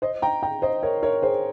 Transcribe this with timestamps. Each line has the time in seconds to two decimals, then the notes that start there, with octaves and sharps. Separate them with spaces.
0.02 C5 D#5
0.22 G5 A#5
0.43 G5 A#5
0.62 C5 D#5
0.83 A#4 C#5
1.03 A#4 C#5
1.22 G#4 C5